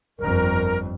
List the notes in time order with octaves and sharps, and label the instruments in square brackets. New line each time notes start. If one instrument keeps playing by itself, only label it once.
[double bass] G1 F2 [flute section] A#4